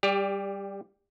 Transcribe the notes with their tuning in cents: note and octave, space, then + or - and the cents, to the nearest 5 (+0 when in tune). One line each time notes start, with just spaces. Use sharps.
G3 +0 G4 +30 D5 -10